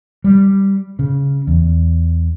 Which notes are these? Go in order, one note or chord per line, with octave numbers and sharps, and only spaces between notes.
G3
C#3
E2